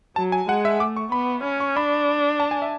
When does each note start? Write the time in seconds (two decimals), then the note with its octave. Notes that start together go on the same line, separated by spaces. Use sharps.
0.16 F#3 A5
0.32 G#5
0.49 G#3 F#5
0.65 E5
0.80 A3 D6
0.97 C#6
1.12 B3 B5
1.44 C#4
1.60 C#6
1.76 D4 B5
2.40 A5
2.51 G#5
2.62 E5